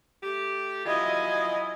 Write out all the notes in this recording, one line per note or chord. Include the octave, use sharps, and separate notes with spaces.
A3 G4
F#3 E4 F4 D#5 G#5